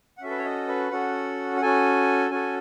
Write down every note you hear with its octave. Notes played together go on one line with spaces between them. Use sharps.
F#5
C#4 F#4 A4 E5
B4
C#5
D#5
B4
C#4 F#4 A4 F#5
F#5
C#4 F#4 A4 G#5
C#4 F#4 A4 G#5